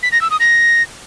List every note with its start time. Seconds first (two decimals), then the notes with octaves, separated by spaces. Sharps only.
0.03 B6
0.12 A#6
0.21 E6
0.31 D#6
0.40 A#6